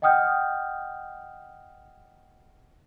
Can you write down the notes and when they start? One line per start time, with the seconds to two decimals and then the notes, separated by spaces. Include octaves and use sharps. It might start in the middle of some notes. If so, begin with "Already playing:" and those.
0.02 D#5 F#5 G5 D#6 F6 G6